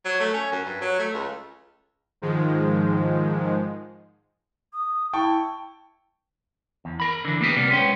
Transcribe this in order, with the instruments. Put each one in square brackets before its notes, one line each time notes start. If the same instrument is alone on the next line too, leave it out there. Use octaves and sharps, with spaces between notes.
[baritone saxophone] F#3
A3
C#4
F#2
G2
F#3
A3
C#2
[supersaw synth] G#2 D#3 F3 G#3
[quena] D#6
[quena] E4 [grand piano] G5 A5 C#6
[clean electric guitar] E2
A#4 B5
D3 E3
A#3 B3 G4 G#4
C3 G3 A#3 B3
G#3 B3 C#4 G5